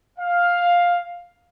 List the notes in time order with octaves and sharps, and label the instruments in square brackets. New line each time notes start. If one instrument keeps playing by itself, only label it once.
[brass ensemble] F5